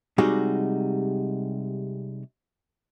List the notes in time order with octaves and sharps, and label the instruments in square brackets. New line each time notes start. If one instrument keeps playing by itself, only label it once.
[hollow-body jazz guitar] C3 G3 G#3 D#4 F#4